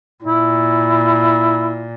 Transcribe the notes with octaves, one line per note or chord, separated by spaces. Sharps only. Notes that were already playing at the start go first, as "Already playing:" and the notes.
A#2 E4